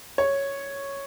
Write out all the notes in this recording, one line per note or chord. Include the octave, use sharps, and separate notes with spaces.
C#5